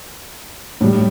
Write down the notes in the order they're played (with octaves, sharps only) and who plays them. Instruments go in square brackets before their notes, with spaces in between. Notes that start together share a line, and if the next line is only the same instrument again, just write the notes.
[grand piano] A2 G3